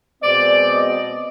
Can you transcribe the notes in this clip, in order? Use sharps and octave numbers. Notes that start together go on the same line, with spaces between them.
B2 G#3 C4 D5
D#5